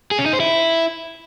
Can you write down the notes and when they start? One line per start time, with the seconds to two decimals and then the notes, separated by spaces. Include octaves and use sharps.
0.11 G#4
0.19 C#4
0.26 D#4
0.33 C5
0.40 E4